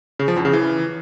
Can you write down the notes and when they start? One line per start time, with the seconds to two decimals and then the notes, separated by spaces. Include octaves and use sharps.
0.19 C#3
0.28 F3
0.36 E2
0.45 C#3
0.53 E3